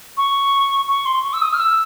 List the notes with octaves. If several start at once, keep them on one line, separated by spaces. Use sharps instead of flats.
C#6
C#6
C6
C#6
E6
D#6
F6
E6